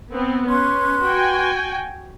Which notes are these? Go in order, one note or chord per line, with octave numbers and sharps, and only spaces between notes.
B3 C4
C#4 B4 C6
F#4 G5 G#5